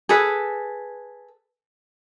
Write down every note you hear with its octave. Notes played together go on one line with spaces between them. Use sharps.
G#4 A4 B4